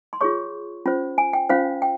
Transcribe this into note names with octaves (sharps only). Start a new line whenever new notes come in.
C6
F4 G#4 C#5 C#6
C#4 F4 C5
G#5
G5
C#4 F4 C5 F5
G5